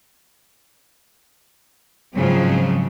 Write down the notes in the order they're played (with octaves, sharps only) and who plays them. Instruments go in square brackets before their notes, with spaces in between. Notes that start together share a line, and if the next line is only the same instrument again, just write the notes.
[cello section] G#2 C#3 F3 F#3 C4